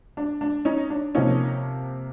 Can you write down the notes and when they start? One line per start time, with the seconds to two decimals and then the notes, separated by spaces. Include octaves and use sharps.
0.17 D4
0.41 D4
0.65 C#4 D#4
0.90 D4
1.15 C3 F3 A#3 C#4 D#4